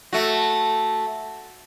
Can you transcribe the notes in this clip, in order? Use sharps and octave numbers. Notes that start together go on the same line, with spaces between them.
A3 F#4